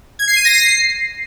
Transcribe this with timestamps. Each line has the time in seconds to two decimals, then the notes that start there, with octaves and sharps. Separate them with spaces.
0.19 G#6
0.28 C7
0.36 D#7
0.45 A#6
0.53 C7